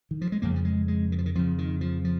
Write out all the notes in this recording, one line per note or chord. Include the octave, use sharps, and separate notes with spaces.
D#3
F3
G#3
F2 C#3 A#3
F3
G#3
G#3
D#3
F3
D#3
F2 C#3 F3
D#3
F3
F3